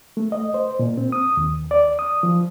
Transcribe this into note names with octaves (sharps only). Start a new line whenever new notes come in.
A3
D#5
C5
A#2
C4
D#6
D#2
D5
D#6
F3